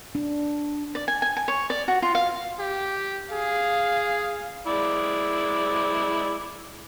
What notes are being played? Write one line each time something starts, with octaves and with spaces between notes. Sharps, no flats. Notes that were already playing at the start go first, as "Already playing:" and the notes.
D4
D5
G#5
G#5
G#5
C#5
D5
F#4
F4
F5
G4
G#4 F5
G#3 E4 D5